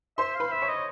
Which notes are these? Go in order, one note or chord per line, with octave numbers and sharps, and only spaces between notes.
C5 E5 C6
F5
B4 B5
E5
C#5 C#6
D#5